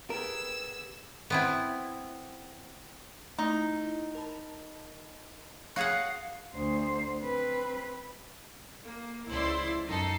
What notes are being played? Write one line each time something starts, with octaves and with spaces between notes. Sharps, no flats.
B3 G4 G#4 A#4 E6
B3 C4 E4
A3 D#4 E4
A#4 A5 B5
F#4 G#4 C#5 F5 F#5 A#6
D2 C5
C4 B4
A#3
C#2 E4 C5 D5 C6
F#2 D#4 A4 C7